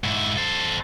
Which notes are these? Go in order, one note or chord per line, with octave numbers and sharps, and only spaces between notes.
G#2 E4
A4 C5